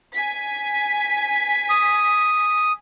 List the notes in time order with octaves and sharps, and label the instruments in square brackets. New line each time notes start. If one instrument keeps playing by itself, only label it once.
[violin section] G#5 B6
[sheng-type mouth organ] D#6